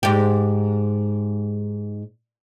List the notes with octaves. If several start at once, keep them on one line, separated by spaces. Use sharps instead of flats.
G#2 G4